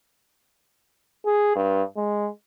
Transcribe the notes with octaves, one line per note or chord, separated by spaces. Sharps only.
G#4
G2
G#3